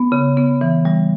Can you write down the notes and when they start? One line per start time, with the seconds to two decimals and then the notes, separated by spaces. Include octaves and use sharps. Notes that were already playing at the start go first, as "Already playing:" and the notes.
Already playing: B3
0.12 C#3
0.37 B3
0.61 E3
0.85 G3